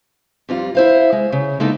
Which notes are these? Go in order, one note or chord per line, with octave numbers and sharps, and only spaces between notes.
F2 G3 F4
E4 C5 F5
G#3
C#3
G#3 A#3 B3 D#4 E4 A4